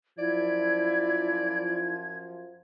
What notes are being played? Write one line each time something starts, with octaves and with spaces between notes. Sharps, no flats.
F#2 F3 E4 D5 G#6